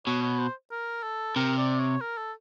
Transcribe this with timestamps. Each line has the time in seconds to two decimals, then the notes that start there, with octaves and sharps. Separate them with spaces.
0.06 B2 C#5
0.23 C#5
0.38 C5
0.71 A#4
1.03 A4
1.36 C3 A#4
1.57 D5
1.79 C#5
2.01 A#4
2.18 A4